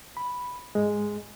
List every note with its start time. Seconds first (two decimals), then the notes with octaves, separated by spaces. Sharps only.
0.17 B5
0.75 G#2 G#3